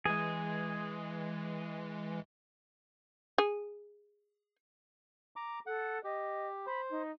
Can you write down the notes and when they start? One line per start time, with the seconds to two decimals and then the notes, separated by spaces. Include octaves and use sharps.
0.05 E3 G#3 G#4
3.38 G#4
5.36 A#5 D6
5.66 A4 F#5
6.04 G4 D#5
6.67 C5 B5
6.91 D#4